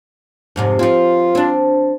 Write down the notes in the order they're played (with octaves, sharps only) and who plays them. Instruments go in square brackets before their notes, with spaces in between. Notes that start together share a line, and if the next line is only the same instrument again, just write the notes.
[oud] F2 G#2 C3
[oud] F3 C4 [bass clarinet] F4
[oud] C4 D4